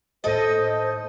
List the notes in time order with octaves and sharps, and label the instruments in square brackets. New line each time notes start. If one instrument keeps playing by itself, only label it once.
[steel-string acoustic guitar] D#2 A3 A4 [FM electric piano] A2 A6 [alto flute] C5 [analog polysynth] D#5